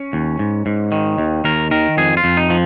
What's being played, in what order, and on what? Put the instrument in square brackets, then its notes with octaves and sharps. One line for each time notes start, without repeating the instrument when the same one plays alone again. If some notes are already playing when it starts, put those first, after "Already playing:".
Already playing: [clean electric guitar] C#4
D#2
G#2
G#2
D#3
D#2
D#2 A#4
D#3 A#4
F2 G#4
F4
F2
D#4
F3